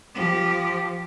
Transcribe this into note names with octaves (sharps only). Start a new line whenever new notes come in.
F3 G4